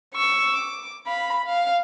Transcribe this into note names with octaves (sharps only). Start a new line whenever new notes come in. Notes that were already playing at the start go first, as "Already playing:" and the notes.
C#6 E6
D6
F5 B5
F5